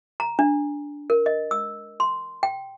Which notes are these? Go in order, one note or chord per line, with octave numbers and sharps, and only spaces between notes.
A#5
D4
A#4
D#5
E6
C6
G5